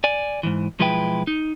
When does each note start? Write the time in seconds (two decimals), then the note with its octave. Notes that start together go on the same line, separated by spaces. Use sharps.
0.04 D5 G#5
0.43 G#2 B2 E3
0.79 B1 F3 G#3 E4 B4 G5
1.27 D#4